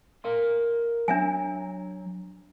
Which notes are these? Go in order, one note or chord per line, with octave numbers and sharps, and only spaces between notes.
A#4 F5 C6
F#3 D4 E5 G#5